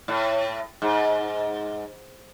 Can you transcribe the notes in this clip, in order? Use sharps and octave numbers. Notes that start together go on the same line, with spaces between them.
A2
G#2